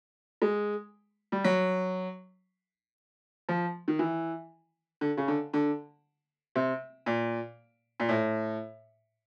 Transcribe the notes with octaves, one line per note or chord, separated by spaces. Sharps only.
G#3
G3
F#3
F3
D#3
E3
D3
C#3
D3
D3
C3
A#2
A#2
A2